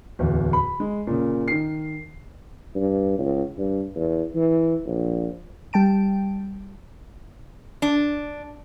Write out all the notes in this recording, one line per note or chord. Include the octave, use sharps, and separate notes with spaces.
D1 E2
B5
G#3
A#2 C#3
D#3 C7
G2
C#2
G2
E2
E3
A#1
G3 G5 A5 D7
D4